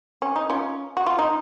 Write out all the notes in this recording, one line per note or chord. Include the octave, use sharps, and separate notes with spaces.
C#4
D#4
C#4 F4
F#4
F4
D#4